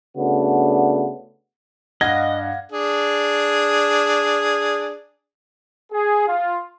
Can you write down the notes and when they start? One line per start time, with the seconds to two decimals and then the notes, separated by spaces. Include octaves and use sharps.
0.17 C#3 A3 B3 D4 F#4
2.01 G2 D#5 F5 F#5 G#6 A#6
2.72 D4 G#4
5.93 G#4
6.27 F4